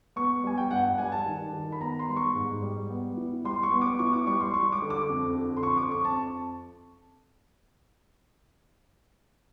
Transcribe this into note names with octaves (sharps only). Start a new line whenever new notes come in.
B3 C#6
G3 G#5
G5
G2 F#5
F#5
G3 G#5
A5
D#3
D#3
B5
B3 A#5
C6
G3
C#6
G#2
G3
B3
E3
G3 C6
C#6
B3
D6
E3 C#6
D6
G3 C#6
C6
G3 C#6
D6
D3
D6
F2
D3
C6
F2 C#6
D6
F2 C#6
A5